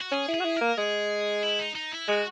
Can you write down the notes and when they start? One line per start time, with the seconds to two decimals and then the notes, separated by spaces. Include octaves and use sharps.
0.01 F#4
0.12 C#4 G#4
0.28 E4
0.34 G#4
0.40 F#4
0.45 E4
0.56 A#3 A#4
0.77 G#3 G#4
1.43 E4
1.59 D#4
1.75 D#4
1.92 E4
2.08 G#3 F#4